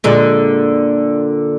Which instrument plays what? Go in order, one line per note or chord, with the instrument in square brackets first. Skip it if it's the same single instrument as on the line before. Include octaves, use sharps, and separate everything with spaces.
[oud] A#2 D3 G#3